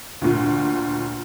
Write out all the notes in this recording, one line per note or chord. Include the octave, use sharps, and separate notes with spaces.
D2 A#2